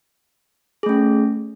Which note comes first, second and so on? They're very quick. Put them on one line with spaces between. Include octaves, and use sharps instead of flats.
G#4 A3 C#4